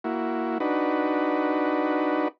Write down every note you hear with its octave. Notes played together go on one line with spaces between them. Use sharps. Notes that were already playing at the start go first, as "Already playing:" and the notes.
A#3 E4 F#4
D4 D#4 F#4 B4